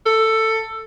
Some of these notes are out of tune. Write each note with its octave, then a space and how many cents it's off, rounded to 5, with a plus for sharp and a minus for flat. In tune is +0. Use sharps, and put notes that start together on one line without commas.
A4 +15